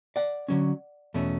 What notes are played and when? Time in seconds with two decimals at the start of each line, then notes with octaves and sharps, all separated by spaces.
0.16 D5 F#5
0.48 D3 F#3 C#4
1.14 E2 B2 A3 C#4